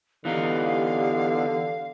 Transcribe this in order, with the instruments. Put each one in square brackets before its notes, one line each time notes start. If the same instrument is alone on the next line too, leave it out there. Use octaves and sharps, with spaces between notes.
[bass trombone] D3 [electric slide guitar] E3 B3 D#4 [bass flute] G4 [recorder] F5